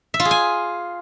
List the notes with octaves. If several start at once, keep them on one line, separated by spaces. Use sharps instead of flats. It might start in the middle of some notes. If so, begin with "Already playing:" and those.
E5
F4
G#4
G#5